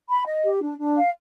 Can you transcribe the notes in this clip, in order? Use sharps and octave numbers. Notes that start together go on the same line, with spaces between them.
B5
D#5
G4
D4
D4
F5